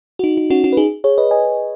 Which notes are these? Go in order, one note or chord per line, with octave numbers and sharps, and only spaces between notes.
F#4
D#4
D#4
C#4 F#4
C#4 F#4
B4
D#4 G#4
G#4 C#5
B4 D#5
D#5 G#5